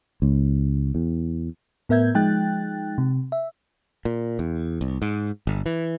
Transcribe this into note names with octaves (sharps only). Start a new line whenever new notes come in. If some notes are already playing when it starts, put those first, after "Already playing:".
C#2
E2
A2 B3 A#4 E5 G6 G#6
F3 G#3 D#4 G5 F#6 A6
C3
E5
A#2
E2
C2
G#2
G1
E3